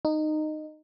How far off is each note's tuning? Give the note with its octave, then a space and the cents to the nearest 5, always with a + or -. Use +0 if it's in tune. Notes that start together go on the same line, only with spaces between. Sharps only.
D#4 -15